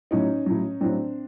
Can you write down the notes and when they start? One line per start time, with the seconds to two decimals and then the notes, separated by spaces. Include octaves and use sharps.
0.11 A2 F#3 C#4 D#4
0.46 A2 F#3
0.81 A2 F#3 C4 D4